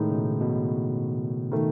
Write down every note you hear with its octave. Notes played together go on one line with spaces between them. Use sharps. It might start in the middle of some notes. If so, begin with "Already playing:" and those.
Already playing: A2 D#3 G#3 D#4
C#3
B2
B2
D#3 A3